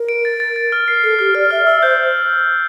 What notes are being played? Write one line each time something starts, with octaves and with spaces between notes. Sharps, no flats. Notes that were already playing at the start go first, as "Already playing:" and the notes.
Already playing: A#4
D7
A6
A6
A6
F6
C7
A4 C7
G4 F6
D5 F6
E5 F6
E5 E6
C5 G6